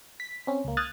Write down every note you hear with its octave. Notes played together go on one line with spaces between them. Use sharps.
B6
C4 C#4
C#2 A#3
D#6 F6 F#6 G#6 A6